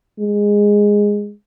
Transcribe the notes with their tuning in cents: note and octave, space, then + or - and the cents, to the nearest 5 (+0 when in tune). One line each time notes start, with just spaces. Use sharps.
G#3 -10